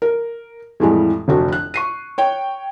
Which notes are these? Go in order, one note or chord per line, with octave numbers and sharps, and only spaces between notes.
A#4
F2 A2 E3 G3 G#3
F1 D2 D4 F#4
F#6
C#6 C7 D#7
C#5 G5